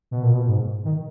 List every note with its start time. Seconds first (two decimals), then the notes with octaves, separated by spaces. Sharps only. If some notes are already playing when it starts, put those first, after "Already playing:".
0.11 B2
0.23 A#2
0.34 B2
0.47 G#2
0.85 D#3